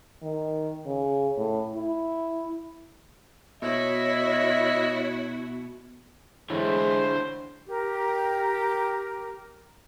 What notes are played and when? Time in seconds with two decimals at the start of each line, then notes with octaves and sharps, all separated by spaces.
0.23 D#3
0.86 C#3
1.37 A2
1.75 E4
3.62 B2 E4 F#4 C#5 D#5 E5
6.50 D3 E3 G#3 E4 C5 C#5 E5
7.68 G4 A#4